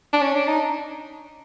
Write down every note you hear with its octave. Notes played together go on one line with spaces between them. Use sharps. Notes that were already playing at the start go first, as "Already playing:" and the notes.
D4
C#4
D4
D#4